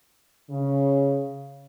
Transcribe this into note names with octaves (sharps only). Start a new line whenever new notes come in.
C#3